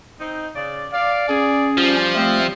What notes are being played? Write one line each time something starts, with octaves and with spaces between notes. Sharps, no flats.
C4 D#4
C#3 D5
D5 F5
C#4 G#4
F3 G3
A3 C4